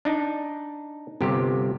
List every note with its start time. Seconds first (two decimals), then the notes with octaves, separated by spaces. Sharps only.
0.05 D4 D#4
1.21 G1 C3 G4